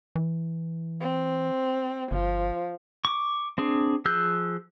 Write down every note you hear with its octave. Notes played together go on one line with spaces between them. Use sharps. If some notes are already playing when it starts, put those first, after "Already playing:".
E3
C4
G1 F3
C#6 D6
C4 D4 G#4
F3 G#4 E6 F#6 G6